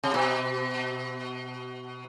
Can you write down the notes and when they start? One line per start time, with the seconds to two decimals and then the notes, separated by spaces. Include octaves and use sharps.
0.04 C3
0.14 B2